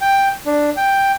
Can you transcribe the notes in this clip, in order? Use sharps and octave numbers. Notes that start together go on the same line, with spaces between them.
G5
D4
G5